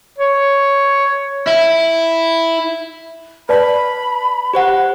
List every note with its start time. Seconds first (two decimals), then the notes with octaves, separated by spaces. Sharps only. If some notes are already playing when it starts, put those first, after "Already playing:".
0.18 C#5
1.48 E4
3.49 B4 D5 A5 B5
4.53 G4 C5 F#5